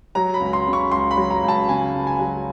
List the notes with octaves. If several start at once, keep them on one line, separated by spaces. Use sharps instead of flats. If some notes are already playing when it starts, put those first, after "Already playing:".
F#3 A#5
B5
C#2
C6
C#3
C#6
C#2 C6
B5
F#3
A#5
C#2
A5
C#3 G#5
C#2
G#5
F#3